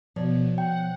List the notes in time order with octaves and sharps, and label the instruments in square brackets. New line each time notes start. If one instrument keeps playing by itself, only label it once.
[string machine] B2 [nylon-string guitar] F3 C#5 D5
[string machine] F#5 [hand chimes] G5